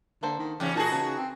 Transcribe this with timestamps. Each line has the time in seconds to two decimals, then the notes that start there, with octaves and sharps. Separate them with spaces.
0.23 D3 A#3 A4 C5
0.39 D#3
0.60 E2 G#2 C#3 C#4 G4
0.75 A#2 A#3 D#4 F#4 G#4 A#4 A5
0.91 C#3 B3 A5
1.17 C4